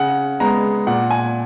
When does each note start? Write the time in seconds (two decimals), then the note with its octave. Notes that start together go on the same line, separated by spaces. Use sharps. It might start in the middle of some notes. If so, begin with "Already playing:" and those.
Already playing: C#3 F#5
0.40 G#3 B3 A#5
0.87 A#2 F#5
1.11 G#5